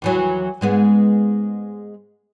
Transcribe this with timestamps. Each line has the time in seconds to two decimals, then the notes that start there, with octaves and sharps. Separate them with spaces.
0.02 D#2 E3 F#3
0.61 G#2 G#3 B3